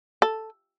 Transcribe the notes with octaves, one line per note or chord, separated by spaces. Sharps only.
A4